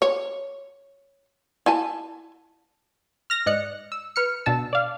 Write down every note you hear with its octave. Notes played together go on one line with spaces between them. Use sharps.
C#5
E4 G#5 A5
F6 A#6
G#2 D5 D#5 F#6 C#7
E6
B4 F6 C#7
B2 D4 A5 E6
D5 F5